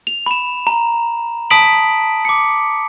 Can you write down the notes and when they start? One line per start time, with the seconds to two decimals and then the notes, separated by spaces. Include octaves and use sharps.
0.07 F7
0.26 B5 E7
0.67 A#5
1.50 A5 B5 D#6 B6 D7 F#7
2.25 D6 C#7